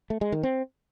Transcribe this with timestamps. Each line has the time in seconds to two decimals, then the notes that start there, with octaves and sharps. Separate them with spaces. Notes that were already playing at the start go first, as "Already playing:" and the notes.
0.10 A3
0.21 G#3
0.32 D#3
0.43 C4